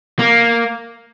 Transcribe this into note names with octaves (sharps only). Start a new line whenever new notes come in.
A#3